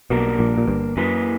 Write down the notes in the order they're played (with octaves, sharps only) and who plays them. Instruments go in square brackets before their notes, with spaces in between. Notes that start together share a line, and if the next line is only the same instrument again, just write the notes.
[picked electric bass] B1 B2 [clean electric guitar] G3 A#3 D4 A#4
[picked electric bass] A#1 A#2
A#2
G1 G2
[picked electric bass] F#2 [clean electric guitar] E3 A#3 E4 B4